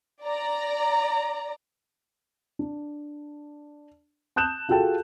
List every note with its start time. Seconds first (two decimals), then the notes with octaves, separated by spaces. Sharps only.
0.24 D5 A#5
2.59 D4
4.36 A5 D#6 F#6 G6 E7
4.69 F4 F#4 G#4 A4 G5 A5